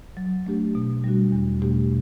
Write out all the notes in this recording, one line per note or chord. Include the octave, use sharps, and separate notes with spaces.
F#3
A3 D4 G4
B2
G3 D4 F#4
E2
B2 A3 D4 G4